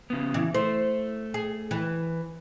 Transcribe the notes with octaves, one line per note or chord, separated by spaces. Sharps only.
C#3 B3
E3
A3 C5
G#4
E3